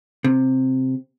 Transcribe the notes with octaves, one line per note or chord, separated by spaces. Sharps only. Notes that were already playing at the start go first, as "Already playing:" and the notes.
C3